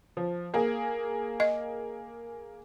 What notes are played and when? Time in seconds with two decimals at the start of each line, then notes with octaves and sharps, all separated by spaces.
0.17 F3
0.54 A#3 G#4
1.40 D#5